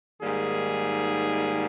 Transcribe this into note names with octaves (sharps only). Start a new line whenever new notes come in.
G#2 D#3 G3 A#3 G#4